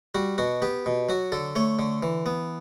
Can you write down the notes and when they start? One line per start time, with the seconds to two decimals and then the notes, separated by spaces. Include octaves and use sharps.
0.15 G3 F#4
0.38 B2 F#4
0.62 B3 G4
0.86 B2
1.09 F#3 F#4
1.32 D3 A4
1.56 A3 C#5
1.79 D3
2.03 E3
2.26 B3